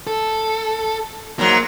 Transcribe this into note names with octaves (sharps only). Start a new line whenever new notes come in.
A4
G#2 F#3 A#3